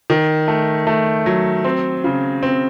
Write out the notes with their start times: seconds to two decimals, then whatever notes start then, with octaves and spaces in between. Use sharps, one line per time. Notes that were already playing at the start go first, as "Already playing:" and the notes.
0.10 D#3
0.48 A3
0.87 A3
1.26 F#3
1.64 C4
2.04 C#3
2.43 C4